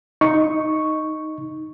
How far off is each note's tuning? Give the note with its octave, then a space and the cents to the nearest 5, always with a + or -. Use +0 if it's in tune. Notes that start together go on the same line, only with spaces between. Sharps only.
D#4 +0 C#6 +0